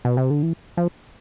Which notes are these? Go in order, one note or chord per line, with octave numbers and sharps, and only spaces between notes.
B2
C3
D3
E3
F3